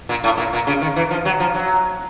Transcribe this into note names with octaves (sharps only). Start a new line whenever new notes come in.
A#2
A2
A#2
A#2
C#3
D#3
E3
F3
F#3
F3
F#3